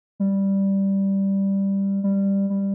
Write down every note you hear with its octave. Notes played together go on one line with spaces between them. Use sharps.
G3
G3
G3